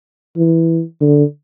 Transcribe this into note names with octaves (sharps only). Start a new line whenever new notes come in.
E3
D3